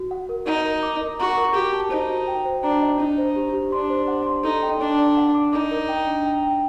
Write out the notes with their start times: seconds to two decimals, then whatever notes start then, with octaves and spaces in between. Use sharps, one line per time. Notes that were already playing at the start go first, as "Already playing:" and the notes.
Already playing: F#4
0.11 F#5
0.29 A#4
0.46 D#4 F#5
0.65 A#4
0.83 D6
1.01 A#4
1.19 F#4 A#5
1.37 A#4
1.55 F#4 G4
1.74 A5
1.91 D#4 C5
2.10 F#4
2.28 G5
2.45 C5
2.64 D4 A#5
2.82 D#5
3.00 D4 D#4
3.18 C5
3.36 G4
3.54 G4
3.72 D4 C6
3.90 C5
4.08 F#5
4.26 C6
4.44 D#4 A4
4.62 G5
4.81 D4 D5
4.99 D5
5.17 F#5
5.35 D6
5.53 D#4 D6
5.71 A#4
5.89 G5
6.07 D4
6.26 G5
6.43 G5